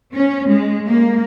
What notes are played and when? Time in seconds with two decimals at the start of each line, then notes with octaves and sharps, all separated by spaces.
0.14 C#4
0.49 G#3
0.87 A#3